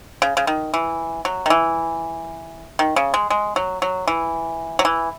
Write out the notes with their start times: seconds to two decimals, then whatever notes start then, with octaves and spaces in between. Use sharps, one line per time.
0.22 C#3
0.37 C#3
0.47 D#3
0.74 E3
1.25 F#3
1.46 D#3
1.50 E3
2.79 D#3
2.96 C#3
3.14 G#3
3.30 G#3
3.56 F#3
3.82 F#3
4.07 E3
4.79 F#3
4.85 E3